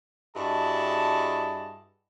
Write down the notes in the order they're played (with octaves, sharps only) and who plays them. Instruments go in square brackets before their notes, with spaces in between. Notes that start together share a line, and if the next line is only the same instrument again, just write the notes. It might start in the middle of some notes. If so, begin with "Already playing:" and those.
[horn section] G2 E4 F#4 G#4 D#5 A5